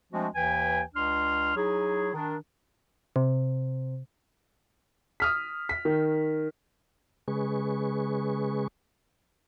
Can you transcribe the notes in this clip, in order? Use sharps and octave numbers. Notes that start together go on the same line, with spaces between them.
F3 G#3 A3 C4 D4 F#4
D#2 E3 B4 G5 G#5
C#2 D4 C6 F6
F#3 D#4 E4 G#4
D#3 D4
C3
D#6 F6 B6
B6
D#3
C#3 G#3 G#4 B4 C#6